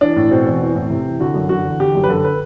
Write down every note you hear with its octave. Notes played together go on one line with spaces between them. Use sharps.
E3 D4
A2
B2 C4
E2
E3
A2
C3
E3
D3 F#4
F#2
D3 F#4
E2
D3 G4
F#2
B4
D3 A4
B4